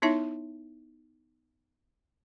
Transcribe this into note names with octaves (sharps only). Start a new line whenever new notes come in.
B3 D#4 E4 C#5 E5 A5